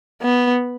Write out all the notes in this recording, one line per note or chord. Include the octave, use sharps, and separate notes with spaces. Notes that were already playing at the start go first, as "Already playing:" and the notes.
B3